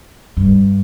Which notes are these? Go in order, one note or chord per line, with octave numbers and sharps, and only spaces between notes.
G2